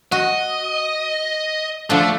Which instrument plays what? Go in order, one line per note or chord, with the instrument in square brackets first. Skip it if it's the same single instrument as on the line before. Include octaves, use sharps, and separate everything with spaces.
[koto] F#4 [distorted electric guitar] D#5
[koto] D3 F3 D4 [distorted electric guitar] A3